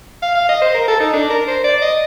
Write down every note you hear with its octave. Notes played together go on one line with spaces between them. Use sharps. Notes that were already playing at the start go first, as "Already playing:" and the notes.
F5
F5
D#5
C5
A#4
A4
D#4
D4
A#4
C5
D5
D#5